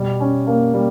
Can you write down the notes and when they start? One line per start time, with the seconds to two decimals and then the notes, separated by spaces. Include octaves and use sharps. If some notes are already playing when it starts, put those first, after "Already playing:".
Already playing: B2 G3
0.20 C#4
0.47 A#3
0.74 G3